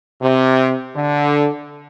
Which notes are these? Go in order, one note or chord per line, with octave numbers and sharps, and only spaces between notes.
C3
D3